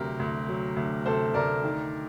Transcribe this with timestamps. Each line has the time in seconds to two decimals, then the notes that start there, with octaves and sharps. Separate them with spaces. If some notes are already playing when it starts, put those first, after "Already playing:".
Already playing: D2 C3 F#3 G4 A#4
0.19 D2
0.49 F#3
0.76 D2
1.06 C3 A4 C5
1.34 D2 A#4 D5
1.64 D#3